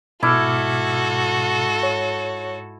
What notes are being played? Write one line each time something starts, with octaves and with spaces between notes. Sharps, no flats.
G#2 B2 E4 F#4 A4 D6 F6
C#5